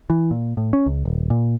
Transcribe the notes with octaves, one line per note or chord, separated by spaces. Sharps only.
E3
A#2
A2
C#4
C#2
D#1
A#2